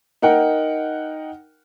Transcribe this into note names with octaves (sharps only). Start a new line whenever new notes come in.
D#4 A#4 F#5 G5